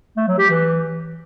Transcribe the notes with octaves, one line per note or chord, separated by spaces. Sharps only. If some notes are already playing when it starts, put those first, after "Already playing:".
A3
F#3
G4
E3